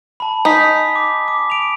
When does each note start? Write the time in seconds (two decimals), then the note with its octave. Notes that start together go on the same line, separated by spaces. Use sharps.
0.20 A5 B5
0.45 D#4 G#5 D#6 B6
0.96 D6
1.28 D6
1.50 D7 F7